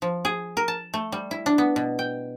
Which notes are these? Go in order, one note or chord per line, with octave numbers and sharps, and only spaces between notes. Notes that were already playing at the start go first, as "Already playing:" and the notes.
F3
G#4
A#4
A5
A3
G3
E4
D4
B3
B2
G5